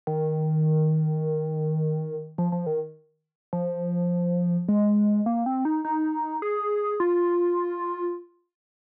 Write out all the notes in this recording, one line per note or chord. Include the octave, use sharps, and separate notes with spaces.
D#3
F3
F3
D#3
F3
G#3
A#3
C4
D#4
D#4
G#4
F4